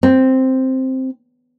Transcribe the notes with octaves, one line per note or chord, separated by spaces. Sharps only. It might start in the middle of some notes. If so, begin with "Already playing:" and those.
C4